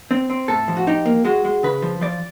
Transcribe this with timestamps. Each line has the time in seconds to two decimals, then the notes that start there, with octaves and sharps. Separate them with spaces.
0.11 C4
0.30 C4
0.48 A2 A4
0.68 F3
0.77 F#4
0.87 D#4 G4
1.06 A#3
1.25 G#3 F#4
1.45 G#3
1.63 C#3 B4
1.82 F3
2.01 F3 D5